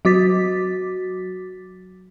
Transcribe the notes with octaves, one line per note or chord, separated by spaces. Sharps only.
F#3 F#4 D6 A6 B6